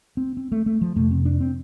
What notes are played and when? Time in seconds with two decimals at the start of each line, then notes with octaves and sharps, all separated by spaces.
0.17 C4
0.37 C4
0.52 A3
0.66 A3
0.81 F3
0.96 F2 C3 A3
1.11 C4
1.25 D4
1.41 C4